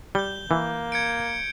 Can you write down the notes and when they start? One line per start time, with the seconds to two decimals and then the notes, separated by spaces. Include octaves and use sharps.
0.15 G3 G6 G7
0.51 E3 A#3
0.92 G#6 C#7 D7